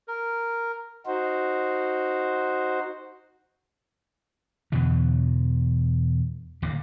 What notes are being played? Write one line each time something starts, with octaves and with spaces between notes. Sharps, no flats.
A#4
D#4 F#4 C5
E2 B2 D3 E3
D1 D#2 C#3 A#3